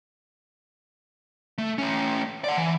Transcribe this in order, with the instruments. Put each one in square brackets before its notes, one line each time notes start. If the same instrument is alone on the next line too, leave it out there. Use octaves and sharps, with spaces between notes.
[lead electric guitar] A3
A3 C#4
D5 F#5
E3